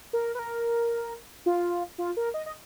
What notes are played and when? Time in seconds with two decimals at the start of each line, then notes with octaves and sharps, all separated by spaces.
0.13 A#4
0.35 B4
0.39 A#4
1.46 F4
1.98 F4
2.17 A#4
2.34 D#5
2.46 D#5